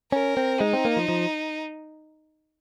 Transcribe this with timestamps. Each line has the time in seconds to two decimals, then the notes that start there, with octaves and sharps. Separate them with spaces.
0.12 C#4 A#4
0.37 C4
0.60 G#3 D#4
0.73 C4
0.85 A#3
0.97 F3
1.09 F3